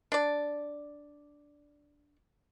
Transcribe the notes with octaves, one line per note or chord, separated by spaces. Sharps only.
D4 D5